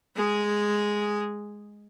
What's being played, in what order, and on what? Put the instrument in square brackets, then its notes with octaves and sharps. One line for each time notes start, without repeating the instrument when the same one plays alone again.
[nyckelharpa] G#3 G#4